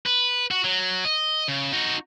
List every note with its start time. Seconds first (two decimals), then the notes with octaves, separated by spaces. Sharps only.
0.06 B4
0.51 F#4
0.64 F#3
1.05 D#5
1.48 C#3
1.72 D#4 F#4